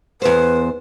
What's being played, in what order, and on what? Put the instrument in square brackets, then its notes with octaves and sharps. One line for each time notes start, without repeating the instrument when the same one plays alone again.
[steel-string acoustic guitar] E2 C5 [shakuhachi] B4